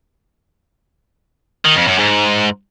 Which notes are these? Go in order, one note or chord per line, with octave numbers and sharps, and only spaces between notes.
D#3
F2
F#2
G#2